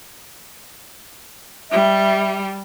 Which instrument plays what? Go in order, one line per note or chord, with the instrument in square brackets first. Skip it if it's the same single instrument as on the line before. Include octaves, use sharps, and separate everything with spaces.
[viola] G3 [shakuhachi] E5